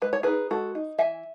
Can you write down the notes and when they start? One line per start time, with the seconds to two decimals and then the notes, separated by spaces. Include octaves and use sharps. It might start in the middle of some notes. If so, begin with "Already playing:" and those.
0.02 G#3 B4
0.13 C#5
0.23 D#4 G#4 B4
0.51 G#3 F#4 A4
0.75 D#4
0.98 E3 E5 G#5